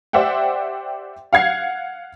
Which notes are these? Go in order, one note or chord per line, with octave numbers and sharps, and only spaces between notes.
G4 C5 D5 E5 F#5 G5
F5 F#5 G#6 C7